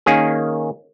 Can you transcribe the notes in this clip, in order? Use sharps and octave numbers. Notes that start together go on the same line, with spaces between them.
D#3 A#3 C#4 G#4